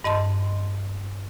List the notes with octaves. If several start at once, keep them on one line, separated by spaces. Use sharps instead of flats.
G2 D#5 A5 C6